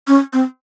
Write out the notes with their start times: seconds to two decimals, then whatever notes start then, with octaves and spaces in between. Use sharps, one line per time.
0.08 C#4
0.33 C4